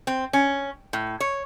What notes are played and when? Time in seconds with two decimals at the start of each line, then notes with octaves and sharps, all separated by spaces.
0.07 C4
0.33 C#4
0.93 A2
1.20 C#5